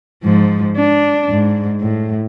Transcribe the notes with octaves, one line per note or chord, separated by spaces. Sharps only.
G#2 F3
D4
G#2
A2